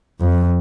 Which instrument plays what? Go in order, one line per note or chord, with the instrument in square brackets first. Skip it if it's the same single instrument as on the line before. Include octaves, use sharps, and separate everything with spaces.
[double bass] F2